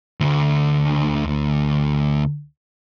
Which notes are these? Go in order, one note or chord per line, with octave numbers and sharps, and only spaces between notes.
D2 D3